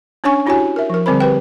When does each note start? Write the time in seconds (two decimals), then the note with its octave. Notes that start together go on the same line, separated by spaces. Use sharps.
0.24 C#4 D4 C#5 G#5 C#6
0.46 D4 E4 F#4 G4 C#5 G#5
0.76 A#4 E5
0.90 F3 A#4
1.06 D3 G3 C4 A#4 C5 B5
1.20 G4 B4 G5